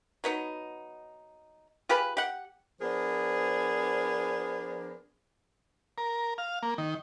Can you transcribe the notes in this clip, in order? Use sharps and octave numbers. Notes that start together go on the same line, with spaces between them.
F#3 B3 D#4
F4 G4 G#4 B4
G4 F#5
F3 B3 D4 G#4 A#4 C5
A#4
F5
A#3
D#3